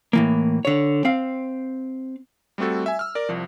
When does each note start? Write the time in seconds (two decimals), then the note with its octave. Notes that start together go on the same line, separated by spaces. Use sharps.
0.13 A2 E3 A#3
0.65 D3 C#5
1.05 C4 F5
2.58 G3 A3 C4 F#4 A4
2.86 E5 G#5
2.99 E6 F6
3.15 A#4 D5
3.29 C2 F3